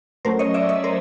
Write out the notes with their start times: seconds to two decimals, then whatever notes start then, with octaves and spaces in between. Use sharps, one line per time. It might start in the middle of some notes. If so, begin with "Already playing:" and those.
0.25 F#3 A3 C#4 A#4 C5
0.39 C#5 D#5
0.54 D5 E5
0.69 C#5 D#5
0.84 A#4 C5